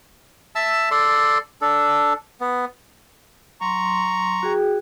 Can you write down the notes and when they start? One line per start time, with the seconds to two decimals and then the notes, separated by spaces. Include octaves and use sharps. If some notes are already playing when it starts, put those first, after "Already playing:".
0.55 E5 A5 E6
0.91 A4 D5 C6
1.61 D4 A4
2.40 B3
3.61 F#3 A#5 C6 C#6
4.43 F#4 G#4 G5